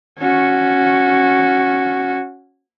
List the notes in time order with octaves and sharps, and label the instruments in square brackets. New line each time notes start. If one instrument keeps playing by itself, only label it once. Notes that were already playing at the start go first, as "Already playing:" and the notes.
[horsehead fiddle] C#4 F#4